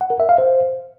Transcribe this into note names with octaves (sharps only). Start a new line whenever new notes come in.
F#5
A#4
E5
F5
C5